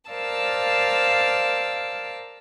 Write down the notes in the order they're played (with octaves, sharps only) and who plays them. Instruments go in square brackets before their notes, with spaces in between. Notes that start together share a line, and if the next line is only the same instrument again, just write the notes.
[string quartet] A#4 C5 D5 F5 A5 E6